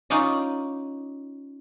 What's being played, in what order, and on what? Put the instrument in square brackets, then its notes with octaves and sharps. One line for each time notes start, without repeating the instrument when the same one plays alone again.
[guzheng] C#4 D#4 F4 D5 D#5